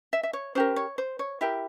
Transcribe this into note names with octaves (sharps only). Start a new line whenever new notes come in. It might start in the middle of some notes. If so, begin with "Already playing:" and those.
E5
E5
C#5
C#4 E4 G4 A#4 C5
C#5
C5
C#5
E4 G4 A#4 E5